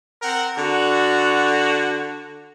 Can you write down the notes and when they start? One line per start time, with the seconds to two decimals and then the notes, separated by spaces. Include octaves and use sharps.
0.22 C4 A#4 F#5
0.58 D3 F#4